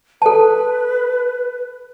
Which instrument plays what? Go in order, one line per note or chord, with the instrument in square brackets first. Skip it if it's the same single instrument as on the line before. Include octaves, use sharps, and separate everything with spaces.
[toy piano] A4 A5 [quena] B4